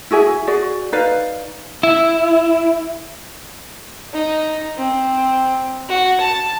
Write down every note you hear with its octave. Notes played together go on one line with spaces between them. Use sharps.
E4 F#4 G#4 E5
F#4 G#4 D5
D#4 B4 D5 F5
E4
D#4
C4
F#4
A5